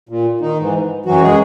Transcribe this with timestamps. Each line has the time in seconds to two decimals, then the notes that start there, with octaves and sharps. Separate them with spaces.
0.09 A#2
0.41 D#3 D#4
0.57 G#2 E3
1.06 F#2 E3 F#3 F#4
1.21 G#3 G#4